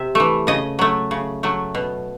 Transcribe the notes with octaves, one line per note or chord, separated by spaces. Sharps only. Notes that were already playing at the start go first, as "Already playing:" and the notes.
Already playing: C3 E5
E3 A3
C#3 D#5
F#3 A3
C#3
F#3 A3
B2